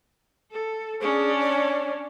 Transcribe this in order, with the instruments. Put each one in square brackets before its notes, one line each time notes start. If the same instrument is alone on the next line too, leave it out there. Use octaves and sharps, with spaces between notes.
[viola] A4
[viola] C#4 D4 [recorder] G#4
[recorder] C#5